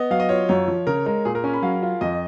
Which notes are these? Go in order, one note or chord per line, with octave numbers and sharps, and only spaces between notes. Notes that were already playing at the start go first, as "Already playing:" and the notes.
Already playing: B3 D#5
F#3 F5
D#5
F4 C#5
F#2 C#5
F3
C#3 A#4
G#3 A#4
A#2 G#4
A#4
C#4 G#5
B5
F#3 F5
F4
F2 D#5